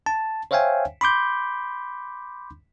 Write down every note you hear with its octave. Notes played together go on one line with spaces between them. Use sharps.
A5
C5 C#5 E5 F5 G5 G#5
B5 C6 D6 G6